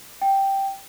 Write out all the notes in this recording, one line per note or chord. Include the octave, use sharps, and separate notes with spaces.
G5